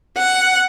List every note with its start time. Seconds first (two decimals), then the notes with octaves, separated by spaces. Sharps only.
0.18 F#5